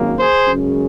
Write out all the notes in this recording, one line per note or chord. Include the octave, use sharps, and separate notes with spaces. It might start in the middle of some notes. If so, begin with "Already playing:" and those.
Already playing: G#1 F#2 D#3 A#3
G#4 C5
F#2 C#3 G#3